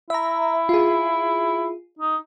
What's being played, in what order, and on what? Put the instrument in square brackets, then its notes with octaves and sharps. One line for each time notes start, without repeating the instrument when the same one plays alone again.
[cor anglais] E4 [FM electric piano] E5 A#5
[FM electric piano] F4 G#4
[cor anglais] D#4